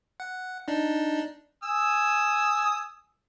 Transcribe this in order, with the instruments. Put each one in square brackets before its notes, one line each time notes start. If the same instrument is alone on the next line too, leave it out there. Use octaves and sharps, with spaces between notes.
[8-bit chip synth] F#5
D4 D#4
[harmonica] G#5 D#6 E6